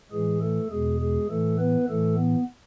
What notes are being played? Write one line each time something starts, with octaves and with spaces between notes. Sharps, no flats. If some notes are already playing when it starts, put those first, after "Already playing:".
A2 E3 G#3 G#4
A3 A4
E2 B2 G#3 G#4
G#3 G#4
A2 E3 A3 A4
B3 B4
A2 E3 A3 A4
B3